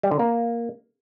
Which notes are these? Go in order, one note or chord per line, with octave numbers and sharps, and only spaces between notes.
G3
D3
A#3